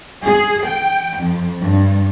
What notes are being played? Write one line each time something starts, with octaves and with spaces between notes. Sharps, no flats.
G#4
G5
F2
G2